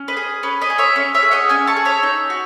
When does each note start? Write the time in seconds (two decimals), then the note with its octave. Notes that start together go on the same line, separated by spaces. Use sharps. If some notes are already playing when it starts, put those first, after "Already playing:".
Already playing: C#4
0.08 B4 D#5
0.17 G#4
0.43 C#4 B4
0.61 B4 D#5
0.70 G#4
0.78 C#5 E5
0.96 C#4
1.14 C#5 E5
1.23 G#4
1.31 D#5 F#5
1.49 C#4 E5 G#5
1.67 A5 C#6
1.77 G#4
1.85 C#5 E5
2.03 D#4
2.30 F#4